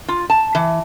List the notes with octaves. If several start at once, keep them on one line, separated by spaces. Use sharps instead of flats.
F4
A5
E3